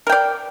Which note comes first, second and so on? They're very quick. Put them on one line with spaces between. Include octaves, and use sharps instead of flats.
A#4 G5 D5